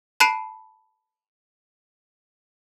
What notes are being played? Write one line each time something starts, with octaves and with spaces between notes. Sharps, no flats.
A5 B5 F#6 C7 D7 D#7